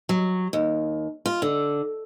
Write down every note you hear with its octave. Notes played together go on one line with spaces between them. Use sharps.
F#3
D#2
F4
D3